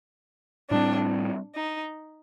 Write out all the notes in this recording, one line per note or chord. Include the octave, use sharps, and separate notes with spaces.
A2 G3 C4 D4
D#4